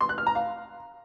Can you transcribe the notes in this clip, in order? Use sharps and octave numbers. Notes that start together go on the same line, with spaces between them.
C6
F#6
F6
A#5
F5